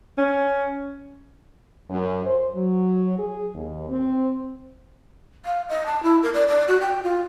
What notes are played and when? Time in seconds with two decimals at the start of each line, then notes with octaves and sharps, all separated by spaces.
0.19 C#4
1.90 F#2
2.25 C5
2.56 F#3
3.19 G#4
3.55 D#2
3.90 C4
5.45 F5
5.69 D#5
5.86 A5
6.03 E4
6.23 A#4
6.34 D5
6.48 D5
6.68 F#4
6.81 G5
7.03 F4